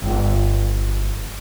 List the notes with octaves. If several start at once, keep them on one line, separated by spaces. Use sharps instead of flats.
G1